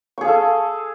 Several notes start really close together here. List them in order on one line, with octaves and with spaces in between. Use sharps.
C#6 G#4 F5 A4